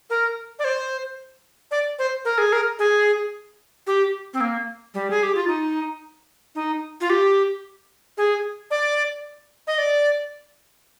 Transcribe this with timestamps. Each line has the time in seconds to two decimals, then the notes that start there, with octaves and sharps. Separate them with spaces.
0.10 A#4
0.59 D5
0.64 C5
1.71 D5
1.99 C5
2.25 A#4
2.38 G#4
2.53 A#4
2.79 G#4
3.87 G4
4.34 C4
4.41 A#3
4.94 G3
5.11 G#4
5.23 G4
5.35 F4
5.48 D#4
6.55 D#4
7.01 F4
7.10 G4
8.17 G#4
8.71 D5
9.67 D#5
9.78 D5